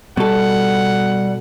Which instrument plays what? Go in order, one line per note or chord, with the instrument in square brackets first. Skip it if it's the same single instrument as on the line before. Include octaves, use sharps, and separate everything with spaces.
[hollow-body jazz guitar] B2 A4 [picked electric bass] G3 [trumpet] F#5